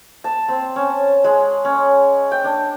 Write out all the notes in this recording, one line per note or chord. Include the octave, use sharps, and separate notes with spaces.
A5
C4
C#4
G#3
C#4
G5
D4